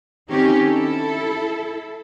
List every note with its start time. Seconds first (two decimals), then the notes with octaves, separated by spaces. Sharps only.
0.29 D#3 C4 C#4 D#4 G4
0.66 E4 A4